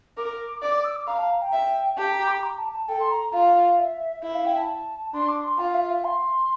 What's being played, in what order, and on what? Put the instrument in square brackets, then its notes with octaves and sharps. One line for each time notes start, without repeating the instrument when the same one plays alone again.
[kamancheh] A#4 [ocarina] D6
[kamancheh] D5 [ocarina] D6
[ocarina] D6
E6
D6
[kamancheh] F5 [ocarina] A#5
[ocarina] A5
A#5
G5
[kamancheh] E5
[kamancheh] G4 [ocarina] A5
[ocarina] A#5
D6
A#5
A5
A5
[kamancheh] A4 [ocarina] G5
[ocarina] C6
A#5
[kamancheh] F4 [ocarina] F5
[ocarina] E5
[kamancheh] E4 [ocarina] E5
[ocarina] F5
G5
A5
[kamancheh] D4 [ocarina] C6
[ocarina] D6
C6
[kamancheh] F4 [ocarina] F5
[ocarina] E5
E5
C6